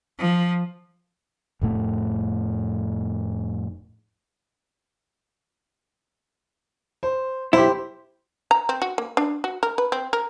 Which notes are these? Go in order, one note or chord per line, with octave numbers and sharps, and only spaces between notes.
F3
F1 A2 A3
C5
B1 E4 G4 C5
A#5
C4
F#4
A#3
D4
F#4
A#4
B4
C4
A#4